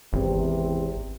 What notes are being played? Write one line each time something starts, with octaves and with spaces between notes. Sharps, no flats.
G#1 E2 C3